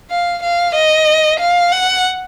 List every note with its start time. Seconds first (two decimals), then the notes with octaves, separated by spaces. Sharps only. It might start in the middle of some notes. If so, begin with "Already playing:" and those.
0.11 F5
0.43 F5
0.75 D#5
1.40 F5
1.72 F#5